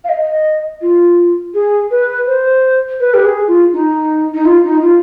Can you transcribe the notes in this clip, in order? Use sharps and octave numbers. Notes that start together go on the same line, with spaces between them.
F5
D#5
F4
G#4
B4
C5
B4
G4
G#4
F4
D#4
D#4
F4
D#4
F4